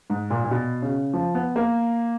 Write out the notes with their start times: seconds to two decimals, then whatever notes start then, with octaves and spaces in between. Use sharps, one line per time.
0.10 G#2
0.30 A#2
0.44 A#2
0.51 B2
0.82 C#3
1.13 F3
1.35 B3
1.56 A#3